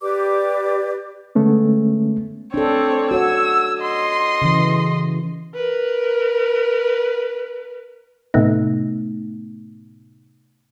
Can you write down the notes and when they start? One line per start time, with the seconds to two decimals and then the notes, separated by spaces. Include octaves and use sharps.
0.01 G4 B4 D5 D6
1.35 D3 G#3 A3 B3 C#4
2.54 C4 D4 A4 C#5
3.11 F#4 C#5 E6
3.82 D#5 C6
4.42 C#3 E3
5.54 A#4 B4
8.34 A2 C3 A3 B3 D#4